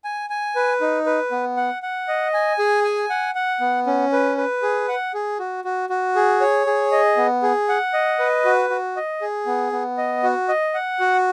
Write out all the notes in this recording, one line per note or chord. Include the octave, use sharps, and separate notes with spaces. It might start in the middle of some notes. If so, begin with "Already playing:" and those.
G#5
G#5
B4
D#4
B4
B3
F#5
F#5
D#5
G#5
G#4
G#5
F#5
F#5
B3
C#4
B4
B4
G#4
F#5
G#4
F#4
F#4
F#4
G#4
C#5
G#4
D#5
B3
G#4
F#5
D#5
B4
F#4
F#4
D#5
G#4
B3
B3
D#5
F#4
D#5
F#5
F#4